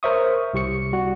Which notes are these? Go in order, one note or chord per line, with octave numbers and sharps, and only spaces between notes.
A#4 C5 C#5 E5 C#6 D#6
C2 G4 C#6 C#7
G3 F#4